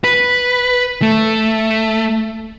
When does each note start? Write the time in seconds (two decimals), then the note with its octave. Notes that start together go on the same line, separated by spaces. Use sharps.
0.04 B4
1.02 A3